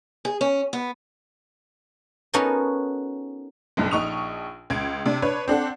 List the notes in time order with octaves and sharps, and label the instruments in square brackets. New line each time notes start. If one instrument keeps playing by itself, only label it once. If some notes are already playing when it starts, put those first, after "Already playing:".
[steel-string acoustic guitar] G#4
C#4
B3
[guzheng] B3 C#4 D#4 F#4 A4 A#4
[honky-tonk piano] F#1 B1 G2
A#1 D#4 C#6 D#6 F7
C#2 G#6 D7
C3 D4
D4 B4 C#5
C4 D4 A4 F#5